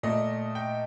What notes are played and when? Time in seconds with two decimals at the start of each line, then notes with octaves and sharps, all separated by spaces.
0.03 A#2 A3 D#5
0.55 G5